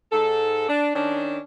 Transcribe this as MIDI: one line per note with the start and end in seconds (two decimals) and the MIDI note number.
0.12 0.65 44
0.12 0.65 69
0.69 0.93 62
0.95 1.39 51
0.95 1.39 61
0.95 1.39 62